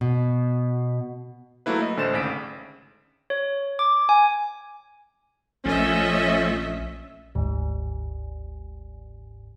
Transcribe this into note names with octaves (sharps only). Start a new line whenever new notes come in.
B2
F#3 A3 A#3 E4 B4
D#5
A1 D3 A3 C5 A6 E7
G#1 C#3 B6 D7
C#5
D6
G#5
A#1 F3 A3 C#4 D#5 E5
G1 D2 G#2